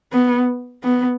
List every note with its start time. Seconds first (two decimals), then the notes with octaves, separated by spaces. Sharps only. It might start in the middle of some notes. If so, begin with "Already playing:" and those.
0.12 B3
0.83 B3